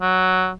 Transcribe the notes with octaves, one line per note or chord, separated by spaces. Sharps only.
F#3